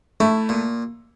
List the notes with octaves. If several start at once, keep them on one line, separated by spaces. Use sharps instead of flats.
A3 E4
A#2